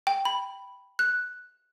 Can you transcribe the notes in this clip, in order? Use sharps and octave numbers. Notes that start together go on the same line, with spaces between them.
G5
B5
F#6